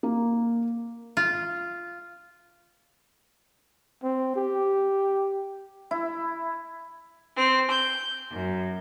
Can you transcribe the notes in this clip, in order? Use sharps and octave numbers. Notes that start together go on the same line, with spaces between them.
A#3
F4
C4
G4
E4
C4
G6
F#2